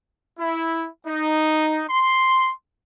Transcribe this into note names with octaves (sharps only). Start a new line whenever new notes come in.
E4
D#4
C6